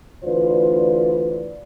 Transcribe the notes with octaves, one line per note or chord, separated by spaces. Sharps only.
D2 E3 F4 B4 C5 D5